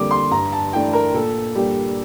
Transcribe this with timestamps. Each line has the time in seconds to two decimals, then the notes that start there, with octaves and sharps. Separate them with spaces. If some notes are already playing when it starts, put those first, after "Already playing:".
Already playing: F2 D3 G3 A#3 D6
0.11 C6
0.31 G2 A#5
0.52 A5
0.73 E3 A3 D4 G5
0.93 A#4
1.14 A#2 A4
1.55 G3 A#3 D4 G4